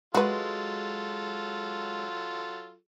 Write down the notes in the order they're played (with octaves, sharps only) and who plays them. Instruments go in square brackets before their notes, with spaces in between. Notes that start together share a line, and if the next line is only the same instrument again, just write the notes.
[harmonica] F#3 F4 A4 [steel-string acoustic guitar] G#3 [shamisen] F#4 B4